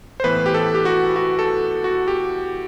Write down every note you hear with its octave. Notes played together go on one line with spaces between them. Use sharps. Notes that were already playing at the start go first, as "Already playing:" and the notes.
C5
A2 E3 B3 B4
G4
A4
G4
F#4
F#4
A4
F#4
G4